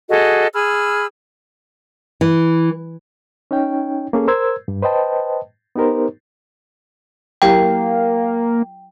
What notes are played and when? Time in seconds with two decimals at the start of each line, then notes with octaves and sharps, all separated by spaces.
0.09 F#4 G#4 A4 D#5
0.53 G#4 B5 E6 F6
2.21 E3
3.51 C#4 D#4 C#5 G5
4.13 A#3 C#4 G#4 A4
4.27 A#4 C5 E6 G#6
4.68 G2
4.82 B4 C5 D#5 G5 A5
5.76 B3 D#4 G4 A#4 C5
7.42 F#3 A#3 E4 G4 G5